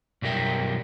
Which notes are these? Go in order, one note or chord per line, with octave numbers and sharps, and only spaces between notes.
B1 F#2 G3 A#4 E5 G5